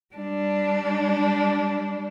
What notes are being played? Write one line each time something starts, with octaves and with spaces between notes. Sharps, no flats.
G3 D4